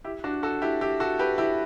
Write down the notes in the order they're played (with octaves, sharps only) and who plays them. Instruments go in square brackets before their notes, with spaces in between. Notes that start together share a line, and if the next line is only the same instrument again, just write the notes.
[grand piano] E4 G4
D4 F#4
F#4 A4
E4 G4
E4 G4
F#4 A4
G4 B4
E4 G4